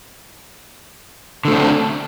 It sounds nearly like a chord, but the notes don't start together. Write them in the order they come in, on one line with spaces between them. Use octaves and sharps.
D3 A3 C4 D4